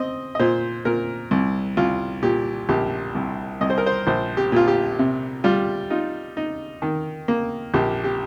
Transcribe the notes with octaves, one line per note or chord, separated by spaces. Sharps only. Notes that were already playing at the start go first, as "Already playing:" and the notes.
Already playing: C4 D#5
D#5
A#2 C5
A#2 A#4
C2
C2 F4
A#2 G4
A#1 G4
C2
C2 D#5
C5
A#4
C5
A#1 C5
G4
A#2 F4
G4
C3
G3 F4
D#4 F4
D#4
D#3
A#3
A#1 G4
G4